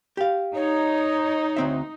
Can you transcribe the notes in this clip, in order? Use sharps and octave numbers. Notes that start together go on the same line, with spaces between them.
G4 F5
D#4 C#5
D2 C4 E5